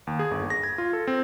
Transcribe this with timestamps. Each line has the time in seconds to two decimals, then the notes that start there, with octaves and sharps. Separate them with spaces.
0.07 D#2
0.19 G#4
0.31 G1
0.50 A#6
0.63 G#6
0.78 F4
0.93 A4
1.07 C4